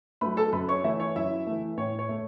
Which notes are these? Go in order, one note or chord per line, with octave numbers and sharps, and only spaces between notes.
F#3 A3 B4 B5
A4 A5
F#2 B4 B5
C#5 C#6
E3 A3 E4 E5
C#5
F#2 E4 E5
E3 A3
A2 C#5
C#5
A3